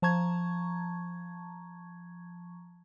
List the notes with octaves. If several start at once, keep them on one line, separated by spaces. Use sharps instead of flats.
F3 A5 A#5 C#6 G#6